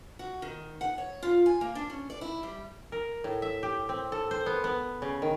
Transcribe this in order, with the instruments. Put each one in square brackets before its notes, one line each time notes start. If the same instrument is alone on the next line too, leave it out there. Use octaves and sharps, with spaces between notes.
[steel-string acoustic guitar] F#4
D#3
F#5
C#5
F4
G#5
A#3
D4
C#4
D5
E4
G3
[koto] A#4
A2
E5
G4
C4
A4
C5
B3
B3
C#3
D#3